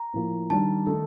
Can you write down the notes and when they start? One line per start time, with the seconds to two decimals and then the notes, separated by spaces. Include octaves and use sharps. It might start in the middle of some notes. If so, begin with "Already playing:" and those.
Already playing: A#5
0.14 A2 F3 A#3
0.50 D#3 G3 D4 A5
0.87 D#3 A3 D#4 A4